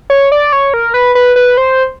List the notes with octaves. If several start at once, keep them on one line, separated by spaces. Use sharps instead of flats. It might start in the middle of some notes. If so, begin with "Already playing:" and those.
C#5
D5
C#5
A#4
B4
B4
B4
C5